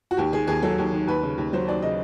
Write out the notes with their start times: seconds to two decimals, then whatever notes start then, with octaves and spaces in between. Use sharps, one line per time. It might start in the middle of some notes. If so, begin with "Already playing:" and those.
0.11 F#4
0.17 D#2 G4
0.32 D#3 G#4
0.47 D#2 G#4
0.63 F#3 A4
0.78 D#2
0.93 D#3
1.07 D#2 B4
1.23 C#3
1.38 D#2
1.53 F#3 C5
1.68 D#2 D5
1.82 C#3 D#5